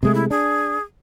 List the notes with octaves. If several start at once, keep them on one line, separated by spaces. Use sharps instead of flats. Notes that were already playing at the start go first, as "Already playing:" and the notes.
C3 G#3 A3 G#4
E4
D4 G#4